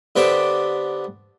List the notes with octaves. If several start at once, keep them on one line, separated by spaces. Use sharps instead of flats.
D3 B3 C4 G4 D5 E5